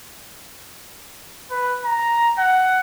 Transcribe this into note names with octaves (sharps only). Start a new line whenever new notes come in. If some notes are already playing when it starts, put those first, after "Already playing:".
B4
A#5
F#5